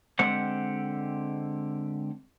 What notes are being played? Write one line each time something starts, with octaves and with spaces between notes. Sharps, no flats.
D3 G#3 C4 G4 C5 F#5